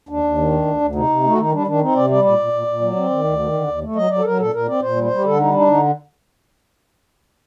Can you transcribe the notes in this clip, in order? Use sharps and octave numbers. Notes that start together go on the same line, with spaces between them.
D#2 D4
D#2
D#3
D2
D2
D2
C3 D#4
C3
A3
F#4
D#3 D#4
G3 D4
D#3 D4
C4 D#4
C3 D5
G3 D5
A#2 D5
A#2
A#2
A#2
F#3
C4
D#3
D2
D#3
D3
D#2
A3
F#3 D#5
F#3 D5
A4
F#3 A#4
A#2 A4
A#2 A#4
C4 D5
A#2 C5
G3
C5
G3
G4
D3 A4
G3 D#4
D4 D#4
D3 D#4